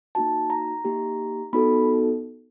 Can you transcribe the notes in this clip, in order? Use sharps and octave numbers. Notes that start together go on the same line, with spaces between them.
A#3 D#4 F#4 A5
A#5
A#3 D#4 G4
B3 D#4 F#4 A4 B5